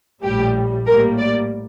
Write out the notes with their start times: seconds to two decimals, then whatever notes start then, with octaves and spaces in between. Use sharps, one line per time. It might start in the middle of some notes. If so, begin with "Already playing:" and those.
0.23 A#1 A2 G3 G4
0.86 A2 G3 A#3 A#4
1.18 D5